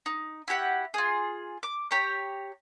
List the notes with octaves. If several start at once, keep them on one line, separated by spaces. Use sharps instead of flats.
D#4
E4 F#4 G4 F#5
F4 G#4
D6
G4 C#5 A#5